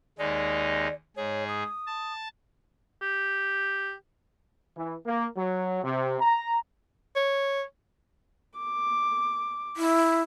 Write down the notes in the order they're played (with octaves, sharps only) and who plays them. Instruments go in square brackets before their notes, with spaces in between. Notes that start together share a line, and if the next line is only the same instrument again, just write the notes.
[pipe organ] D#2 G#3 D#4 [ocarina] D5
[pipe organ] G#2 G#4 [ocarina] C#5
[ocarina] D#6
[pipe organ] A5
[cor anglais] G4
[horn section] E3
A#3
F#3
C3
A#5
[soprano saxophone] C#5
[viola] D6
[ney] E4